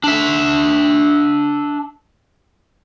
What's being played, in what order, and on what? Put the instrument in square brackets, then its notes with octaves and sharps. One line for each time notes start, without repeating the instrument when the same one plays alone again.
[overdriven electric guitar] D4 E5